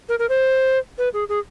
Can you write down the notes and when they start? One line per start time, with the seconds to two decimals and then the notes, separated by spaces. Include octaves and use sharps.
0.09 A#4
0.19 A#4
0.29 C5
0.98 B4
1.14 G#4
1.29 G#4